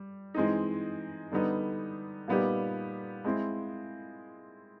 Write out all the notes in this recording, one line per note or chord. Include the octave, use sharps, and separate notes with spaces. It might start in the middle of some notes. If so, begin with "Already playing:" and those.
Already playing: G3
E3 G#3 C4 D#4
D3 G3 B3 D#4
A#2 G3 B3 D#4 G4
G#3 C4 E4